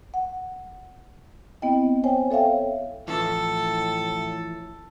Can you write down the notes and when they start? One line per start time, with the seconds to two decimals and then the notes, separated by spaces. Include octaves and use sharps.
0.14 F#5
1.62 B3 C4 E4 D#5 G5
2.04 C5 C#5 G5 G#5
2.31 A4 C#5 E5 F5 G5
3.08 A2 E3 F3 C#4 A4